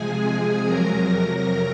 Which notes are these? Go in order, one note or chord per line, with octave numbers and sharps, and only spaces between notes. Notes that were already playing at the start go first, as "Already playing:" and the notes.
Already playing: C3 F3 G#3 G#4 G#5
F2 C3 F#3 A#4 A#5